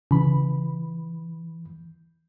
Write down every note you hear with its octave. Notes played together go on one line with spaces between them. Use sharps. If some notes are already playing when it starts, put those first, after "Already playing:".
C#3 E3 B5